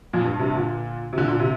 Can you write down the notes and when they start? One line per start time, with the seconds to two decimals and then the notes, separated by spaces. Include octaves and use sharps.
0.13 F2 A#2
0.25 G2
0.39 G2 C3
0.55 A#2 D3
1.13 C3
1.18 A#2 D3
1.28 A#2 D3
1.39 C3